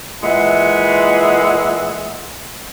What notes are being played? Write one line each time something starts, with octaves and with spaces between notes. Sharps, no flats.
A#2 E3 G#3 E5 F#5